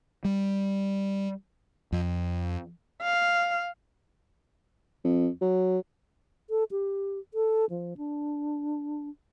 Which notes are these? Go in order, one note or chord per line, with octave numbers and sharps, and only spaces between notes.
G3
F2
F5
F2
F#3
A4
G4
A4
F3
D4